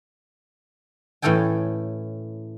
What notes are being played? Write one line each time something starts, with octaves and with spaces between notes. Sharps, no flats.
A2 E3 C#4 A4 G5 G#5